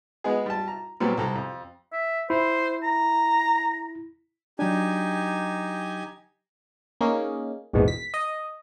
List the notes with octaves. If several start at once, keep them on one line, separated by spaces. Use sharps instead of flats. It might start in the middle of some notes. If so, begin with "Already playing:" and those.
G#3 B3 G#4
G3 A5
A#5
A#2 F#3 G3 B3 C4
C2 A4 A#5
F2
E5
E4 C5
A#5
F#3 D4 D#4 G4 G#5
A#3 C#4 D#4 G#4
A#1 E2 G#2 B2 D#3
B6
D#5